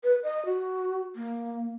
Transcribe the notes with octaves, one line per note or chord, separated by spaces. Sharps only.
B4
D#5
F#4
A#3